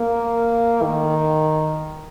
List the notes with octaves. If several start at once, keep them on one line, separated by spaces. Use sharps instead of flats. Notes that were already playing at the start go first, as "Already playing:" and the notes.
Already playing: A#3
D#3